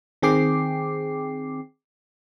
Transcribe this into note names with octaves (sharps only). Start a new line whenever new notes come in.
D#3 C4 G#4 G5 D6 C7